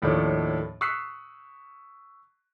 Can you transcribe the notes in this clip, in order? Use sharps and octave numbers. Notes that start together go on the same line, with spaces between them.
D#2 A2 D#3 F3 A3 D4
C#6 D#6 E6 F#6 B6 C7